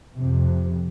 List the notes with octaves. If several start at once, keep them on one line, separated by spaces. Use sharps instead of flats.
F2 C3